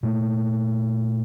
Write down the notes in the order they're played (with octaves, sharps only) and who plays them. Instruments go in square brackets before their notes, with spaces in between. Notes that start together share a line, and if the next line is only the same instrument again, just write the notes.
[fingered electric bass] A#2 A3